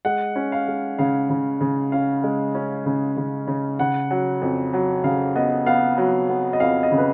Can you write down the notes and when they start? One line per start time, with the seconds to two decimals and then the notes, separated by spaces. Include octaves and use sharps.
0.05 G#3 F#5
0.36 C#4
0.52 F5
0.68 G#3
0.99 C#3 F5
1.30 C#3
1.61 C#3
1.92 C#4 F5
2.24 G#3
2.55 C#4
2.86 C#3
3.17 C#3
3.48 C#3
3.79 C#3 F#5
4.11 F#3
4.42 F2
4.73 F#3
5.04 C#3 F5
5.36 B3 D#5
5.66 B3 F5
5.98 F#3
6.29 B3
6.53 D#5
6.60 F2 F5
6.83 D#5
6.92 C#3
6.98 B4